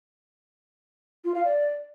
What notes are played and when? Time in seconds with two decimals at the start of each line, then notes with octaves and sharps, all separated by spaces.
1.25 F4
1.35 F5
1.44 D5